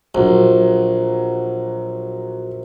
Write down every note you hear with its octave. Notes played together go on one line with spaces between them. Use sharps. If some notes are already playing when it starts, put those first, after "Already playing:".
A#1 F#3